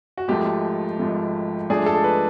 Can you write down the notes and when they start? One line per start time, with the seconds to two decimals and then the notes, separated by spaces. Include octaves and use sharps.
0.17 F#4
0.28 G#1 G#2 F3 A3 G4
0.99 G#1 G#2 F3 A3
1.70 G#2 F3 A3 D4 G#4
1.86 A4
2.04 B4